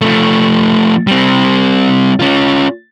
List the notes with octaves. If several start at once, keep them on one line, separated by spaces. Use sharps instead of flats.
F3 A3
G3 C4
C#4 F4